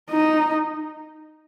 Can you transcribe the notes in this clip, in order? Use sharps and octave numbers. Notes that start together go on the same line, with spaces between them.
D#4